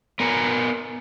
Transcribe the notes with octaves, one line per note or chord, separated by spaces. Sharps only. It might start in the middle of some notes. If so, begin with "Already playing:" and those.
B3 A#4 G#5